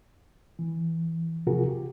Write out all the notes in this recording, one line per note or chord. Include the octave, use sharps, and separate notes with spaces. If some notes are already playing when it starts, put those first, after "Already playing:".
E3
C3 F3 F4 F#4 G#4 A#4
G4